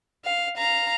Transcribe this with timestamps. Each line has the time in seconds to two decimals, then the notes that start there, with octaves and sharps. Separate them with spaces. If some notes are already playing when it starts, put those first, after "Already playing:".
0.25 F5
0.57 F5 A#5